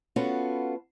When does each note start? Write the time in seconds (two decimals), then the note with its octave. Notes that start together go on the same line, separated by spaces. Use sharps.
0.16 B3 C#4 F4 F#4 A4